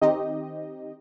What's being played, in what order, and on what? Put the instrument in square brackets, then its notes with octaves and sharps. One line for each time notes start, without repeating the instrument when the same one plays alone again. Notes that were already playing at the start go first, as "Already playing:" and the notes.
[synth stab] D#3 C4 D#4 G4 D#5